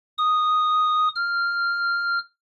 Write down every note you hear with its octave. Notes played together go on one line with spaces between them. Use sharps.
D#6
F6